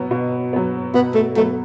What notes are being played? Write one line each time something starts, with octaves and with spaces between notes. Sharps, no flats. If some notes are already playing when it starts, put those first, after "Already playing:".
Already playing: B2 F#3 B3
B2
F#3 B3
B2 B3
A3
F#3 A3 B3